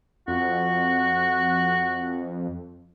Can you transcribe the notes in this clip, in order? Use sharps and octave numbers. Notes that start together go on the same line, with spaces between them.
F2 F#4